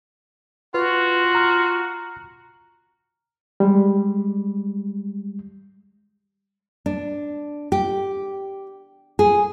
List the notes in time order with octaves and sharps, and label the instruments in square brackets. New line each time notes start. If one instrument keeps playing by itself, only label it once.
[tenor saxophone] F4 [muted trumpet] F#4 [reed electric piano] B4
[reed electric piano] A#5 F6
G3 G#3
[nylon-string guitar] D4
G4
G#4